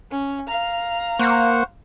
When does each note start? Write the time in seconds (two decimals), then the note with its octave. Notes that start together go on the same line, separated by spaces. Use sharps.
0.11 C#4
0.47 F5 A#5
1.19 A#3 C5 F#5 C#6